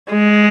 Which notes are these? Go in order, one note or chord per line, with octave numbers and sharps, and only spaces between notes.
G#3